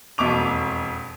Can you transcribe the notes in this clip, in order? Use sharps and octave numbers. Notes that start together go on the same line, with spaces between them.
E1 F2 C#6 D6 F7